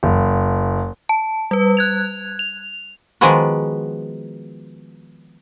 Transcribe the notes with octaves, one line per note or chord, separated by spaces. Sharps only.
F#1
A5
G3 B4
F#6 G#6 F7
F7
D#3 F3 G#3 B3 F#4